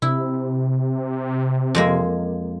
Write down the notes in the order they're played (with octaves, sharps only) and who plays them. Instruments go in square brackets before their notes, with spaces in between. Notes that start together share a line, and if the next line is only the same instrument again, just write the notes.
[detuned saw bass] C3 [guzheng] E4
[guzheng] F2 G#3 A#3